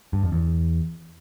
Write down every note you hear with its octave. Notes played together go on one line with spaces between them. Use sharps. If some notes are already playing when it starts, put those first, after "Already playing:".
G2
F2
E2